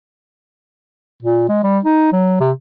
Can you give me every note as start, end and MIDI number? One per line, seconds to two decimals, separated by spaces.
1.23 1.46 46
1.49 1.62 56
1.63 1.79 55
1.85 2.10 63
2.12 2.36 54
2.40 2.52 48